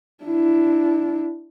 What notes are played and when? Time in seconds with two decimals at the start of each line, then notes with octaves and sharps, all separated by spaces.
0.24 D4 E4